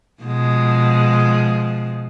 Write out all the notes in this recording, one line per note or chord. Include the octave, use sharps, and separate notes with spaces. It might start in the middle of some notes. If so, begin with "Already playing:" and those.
B2 F3 G#3